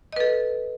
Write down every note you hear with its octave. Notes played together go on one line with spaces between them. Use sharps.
A4 B4 D#5